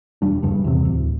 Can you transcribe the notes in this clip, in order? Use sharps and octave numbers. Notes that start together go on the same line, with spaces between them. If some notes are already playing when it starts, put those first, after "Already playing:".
E1 G3 D4
D#1 G2 C#3
E2 C3
D1